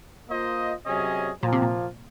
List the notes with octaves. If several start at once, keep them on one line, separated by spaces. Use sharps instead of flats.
A#3 F4 C5 D#5
C3 F#3 C#4 G#4 D#5
A#2 F3 A#3 F4
C3
A#2